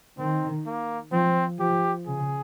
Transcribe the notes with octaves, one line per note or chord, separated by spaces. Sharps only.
D#3 C4
A#3
F3 C4
F3 G4
C#3 G#4